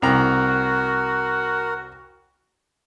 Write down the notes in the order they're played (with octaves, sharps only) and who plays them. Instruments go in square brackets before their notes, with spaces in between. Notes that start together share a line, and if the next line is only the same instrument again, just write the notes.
[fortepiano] C2 A#5 [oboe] F#4 [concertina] A#4